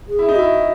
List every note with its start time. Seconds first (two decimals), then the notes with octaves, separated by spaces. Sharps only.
0.08 G#4
0.19 E4
0.29 D#4
0.36 E4 F#4